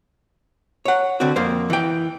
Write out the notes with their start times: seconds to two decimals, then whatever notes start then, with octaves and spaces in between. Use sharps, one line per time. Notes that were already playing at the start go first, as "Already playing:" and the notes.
0.85 C#5 F#5
1.20 D3 C4 F#4
1.36 F2 A#3 C5
1.70 E3 G5